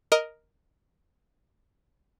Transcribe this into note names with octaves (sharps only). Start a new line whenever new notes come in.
A#4 D#5